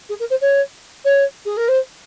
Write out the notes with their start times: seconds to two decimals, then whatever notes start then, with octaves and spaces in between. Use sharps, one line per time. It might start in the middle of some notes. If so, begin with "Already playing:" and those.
0.09 G#4
0.20 A#4
0.30 C5
0.41 C#5
1.05 C#5
1.45 G#4
1.57 A#4
1.68 C5